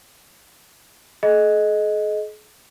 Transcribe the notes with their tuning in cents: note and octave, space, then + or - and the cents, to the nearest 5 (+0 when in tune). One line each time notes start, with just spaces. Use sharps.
G#4 +45 D#5 +0